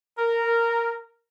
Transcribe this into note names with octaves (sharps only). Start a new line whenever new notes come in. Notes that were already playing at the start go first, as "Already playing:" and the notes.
A#4